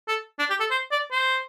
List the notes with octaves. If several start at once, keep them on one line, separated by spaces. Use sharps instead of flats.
A4
D4
G4
A4
C5
D5
C5